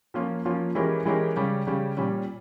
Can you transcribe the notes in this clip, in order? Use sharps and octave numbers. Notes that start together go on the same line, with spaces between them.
F3 A#3 C#4 F4
F3 A#3 C#4 F4
E3 G#3 C#4 G4 A#4
E3 G#3 C#4 G4 A#4
C#3 G3 C#4 G4
C#3 G3 C#4 G4
A#2 G3 C#4